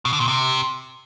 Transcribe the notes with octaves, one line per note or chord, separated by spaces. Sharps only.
B2
D3
A#2
C3